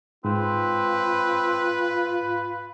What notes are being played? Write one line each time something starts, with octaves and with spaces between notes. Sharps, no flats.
G#2 C4 F4 B4